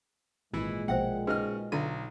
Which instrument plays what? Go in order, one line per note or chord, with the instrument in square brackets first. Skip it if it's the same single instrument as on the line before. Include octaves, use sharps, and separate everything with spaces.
[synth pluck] G#1 [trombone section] A#2 G#3 [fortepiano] E3 E4
[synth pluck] A#1 B2 [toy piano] C5 E5 G5 [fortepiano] F#5
[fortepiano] C#3 D#5 F6 [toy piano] D#4 F#4 B4
[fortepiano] B1 [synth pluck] D3 D#7 [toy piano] E4 F4